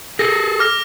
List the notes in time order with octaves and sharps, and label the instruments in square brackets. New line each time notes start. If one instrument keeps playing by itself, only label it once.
[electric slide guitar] G#4 A4 [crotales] A#6
[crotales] D6 F6 A#6